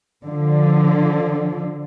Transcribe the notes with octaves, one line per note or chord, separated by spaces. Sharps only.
D3 F3